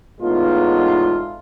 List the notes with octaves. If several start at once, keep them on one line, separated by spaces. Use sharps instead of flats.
E2 A2 G#3 B3 D#4 F4